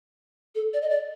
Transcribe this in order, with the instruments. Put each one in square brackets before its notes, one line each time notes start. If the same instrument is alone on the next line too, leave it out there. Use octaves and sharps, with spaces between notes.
[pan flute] A4
D5
D#5
D5